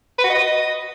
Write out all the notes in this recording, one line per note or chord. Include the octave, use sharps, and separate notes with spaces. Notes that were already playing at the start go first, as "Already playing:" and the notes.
B4
F#4
D#5